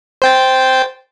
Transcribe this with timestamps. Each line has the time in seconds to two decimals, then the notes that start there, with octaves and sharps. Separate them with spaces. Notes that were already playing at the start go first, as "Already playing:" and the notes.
0.22 C5 G5 A6